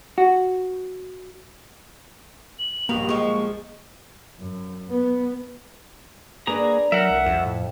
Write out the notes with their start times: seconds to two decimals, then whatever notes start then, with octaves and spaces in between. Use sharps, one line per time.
0.18 F#4
2.59 F#7
2.89 A#1 G2 B2 A#3 F7
3.09 F3 G#3 C#6
4.39 F#2
4.91 B3
6.47 A#3 D4 G#4 B4 A#5
6.92 F#3 A#4 E5 F#5
7.10 C2
7.26 F2
7.45 A2